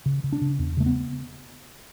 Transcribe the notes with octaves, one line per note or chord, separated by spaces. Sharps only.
C#3
C#3
D4
C#3
E2
C#3 A3
B3